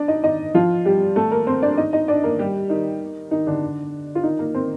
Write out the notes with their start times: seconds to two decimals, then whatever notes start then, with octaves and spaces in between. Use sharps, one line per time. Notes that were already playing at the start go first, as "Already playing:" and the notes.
Already playing: D4 D5
0.08 D#4 D#5
0.24 D#4 D#5
0.54 F3 F4
0.85 G3 G4
1.16 A3 A4
1.31 A#3 A#4
1.47 C4 C5
1.62 D4 D5
1.78 D#4 D#5
1.93 D#4 D#5
2.08 D4 D5
2.23 A#3 A#4
2.39 G3 G4
2.69 D#3 D#4
3.31 D#3 D#4
3.47 D3 D4
4.15 F4
4.23 D#3 D#4
4.39 A#3 A#4
4.54 C4 C5